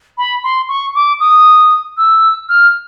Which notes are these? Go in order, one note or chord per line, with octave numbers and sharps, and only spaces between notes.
B5
C6
C#6
D6
D#6
E6
F6